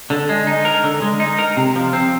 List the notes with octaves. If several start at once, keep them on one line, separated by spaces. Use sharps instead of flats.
D3
G#3
D#4
A#4
D3
G#3
D#4
A#4
C3
F3
C4